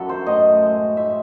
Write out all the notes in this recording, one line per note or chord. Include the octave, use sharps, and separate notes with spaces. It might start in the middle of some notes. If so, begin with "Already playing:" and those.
Already playing: F#2 E4 F#4 A4
C5
A2 D#5
G#3
A2 E5